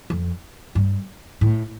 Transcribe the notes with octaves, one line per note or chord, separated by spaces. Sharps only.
F2
G2
A2